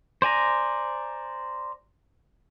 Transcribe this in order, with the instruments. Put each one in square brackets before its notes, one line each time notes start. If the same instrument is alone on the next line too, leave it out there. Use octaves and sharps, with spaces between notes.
[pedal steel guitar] C5 D5 G#5 A#5